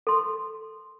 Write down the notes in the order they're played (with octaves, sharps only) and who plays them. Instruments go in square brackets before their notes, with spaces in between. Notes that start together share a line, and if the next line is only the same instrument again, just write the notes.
[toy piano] A4 C6